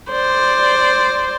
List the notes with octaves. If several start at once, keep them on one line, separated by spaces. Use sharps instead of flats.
C5 D5